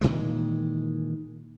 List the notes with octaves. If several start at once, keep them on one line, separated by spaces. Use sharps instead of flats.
A#2 D#3 E3 G#3